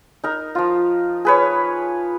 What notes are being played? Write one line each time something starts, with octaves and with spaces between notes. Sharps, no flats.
D#4 A#4
F3 F4
G#4 B4 C#5